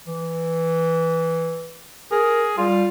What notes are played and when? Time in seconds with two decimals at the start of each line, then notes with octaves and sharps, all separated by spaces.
0.07 E3
2.11 G#4 A#4
2.58 G3 F4